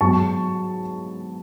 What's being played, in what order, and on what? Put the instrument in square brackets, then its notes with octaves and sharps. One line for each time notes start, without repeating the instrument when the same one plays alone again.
[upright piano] G#2 F#3 B3 A5 C#6